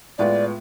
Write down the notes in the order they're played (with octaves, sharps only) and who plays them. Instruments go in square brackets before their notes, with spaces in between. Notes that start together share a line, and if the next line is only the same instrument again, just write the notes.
[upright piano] A2 G#3 B3 F4 [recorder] D5